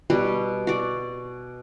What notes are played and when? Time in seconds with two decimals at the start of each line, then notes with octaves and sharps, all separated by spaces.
0.10 B2 G3 F#4
0.67 F#4 D5